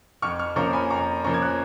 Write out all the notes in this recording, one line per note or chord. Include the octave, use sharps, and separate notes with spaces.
F2 C#6 F6
C#6 F6
F3 A#3 C#4 A#5 C#6
G#5 B5
F2 A#5 C#6
F3 A#3 C#4 A#5 C#6
G#6
F#6